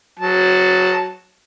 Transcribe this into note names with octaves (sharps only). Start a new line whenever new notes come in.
F#3 A5